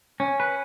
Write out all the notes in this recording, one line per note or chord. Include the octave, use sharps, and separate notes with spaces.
C#4
B4